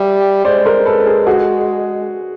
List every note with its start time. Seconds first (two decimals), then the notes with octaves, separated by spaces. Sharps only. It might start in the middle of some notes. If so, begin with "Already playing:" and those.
Already playing: G3 E5
0.45 G#3 C5 D5
0.65 A#4 C5
0.85 A4 B4
1.06 G#4 A#4
1.27 F#4 G#4